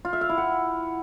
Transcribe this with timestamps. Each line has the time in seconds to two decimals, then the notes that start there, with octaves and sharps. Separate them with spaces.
0.05 F4
0.13 E5
0.21 F5
0.29 E4
0.38 F#5